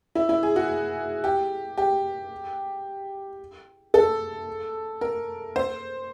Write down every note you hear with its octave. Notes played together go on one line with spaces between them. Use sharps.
E4
E4
G#4
F#4
G4
G4
A4
A#4
C5